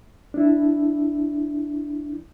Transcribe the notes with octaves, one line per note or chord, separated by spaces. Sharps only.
D4 E4